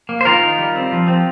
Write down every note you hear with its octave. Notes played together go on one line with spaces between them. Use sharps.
A#3
C5
D#3 F4 A#4
D#4
G3
C4
F3
C4